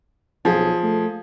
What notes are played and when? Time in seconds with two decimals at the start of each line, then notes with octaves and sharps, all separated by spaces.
0.45 B1 F3 G#4
0.83 A3